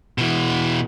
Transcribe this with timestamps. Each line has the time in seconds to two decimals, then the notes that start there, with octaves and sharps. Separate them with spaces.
0.18 B2 E3